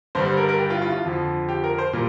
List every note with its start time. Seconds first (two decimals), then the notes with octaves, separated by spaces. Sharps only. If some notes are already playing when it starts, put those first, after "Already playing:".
0.15 G2 D3 G3 C5
0.26 C5
0.37 A#4
0.49 A#4
0.59 G4
0.70 F4
0.82 F4
0.92 F4
1.04 F2 D3 F3
1.49 G4
1.64 A#4
1.74 A#4
1.78 C5
1.93 A#2 G3 A#4